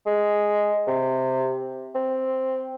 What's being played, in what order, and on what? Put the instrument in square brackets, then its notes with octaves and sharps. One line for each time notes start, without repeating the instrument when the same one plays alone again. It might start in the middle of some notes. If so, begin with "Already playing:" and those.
[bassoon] G#3
C3
C4